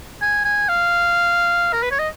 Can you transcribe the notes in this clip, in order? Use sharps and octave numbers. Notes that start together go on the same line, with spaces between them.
G#5
G#5
F5
A#4
B4
C#5
D#5